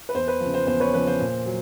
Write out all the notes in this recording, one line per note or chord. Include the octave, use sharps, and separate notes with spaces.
B4
E2 C5
B4
F3
C#3
C5
E2 C5
B4 C#5
C#3 F3 B4
C5
A#2
F#3